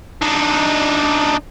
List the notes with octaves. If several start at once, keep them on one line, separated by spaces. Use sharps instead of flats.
D4 D#4